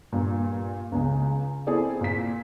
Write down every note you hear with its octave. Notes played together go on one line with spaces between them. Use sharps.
G2 A#2
C#2 C#3
C4 E4 G#4 A4 D5
A#2 B6